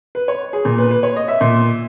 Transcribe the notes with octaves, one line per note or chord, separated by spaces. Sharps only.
B4
C#5
G#4
A#2
B4
B4
C#5
D#5
E5
A#2